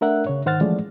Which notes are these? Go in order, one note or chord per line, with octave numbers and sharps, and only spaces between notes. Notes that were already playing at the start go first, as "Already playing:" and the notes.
A3 D4 A#4 E5 F#5 F#6
C#3 C#5
G#2 D#3 C5 F#5 F6 A6
E3 F3 G#3 A3 C#4 D5